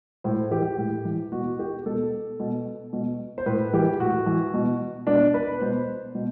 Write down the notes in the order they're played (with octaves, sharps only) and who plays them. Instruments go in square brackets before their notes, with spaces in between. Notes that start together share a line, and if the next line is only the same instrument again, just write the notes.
[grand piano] A2 C5
E3 G4
A2
E3
B2 F#4
G4
B2 A4
B2
B2
C5
A2 B4
E3 G4
A2 F#4
E3
B2
B2 D4
B4
B2 C5
B2